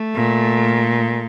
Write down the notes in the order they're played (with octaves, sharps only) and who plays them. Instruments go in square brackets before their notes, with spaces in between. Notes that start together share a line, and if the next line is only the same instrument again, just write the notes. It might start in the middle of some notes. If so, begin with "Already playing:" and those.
Already playing: [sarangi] A3
[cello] A#2